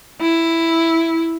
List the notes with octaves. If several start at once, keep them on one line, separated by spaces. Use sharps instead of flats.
E4